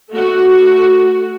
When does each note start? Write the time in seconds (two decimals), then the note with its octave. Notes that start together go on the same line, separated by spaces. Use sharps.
0.11 A3 F#4